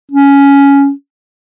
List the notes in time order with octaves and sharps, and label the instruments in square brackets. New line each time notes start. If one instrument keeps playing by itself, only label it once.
[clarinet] C#4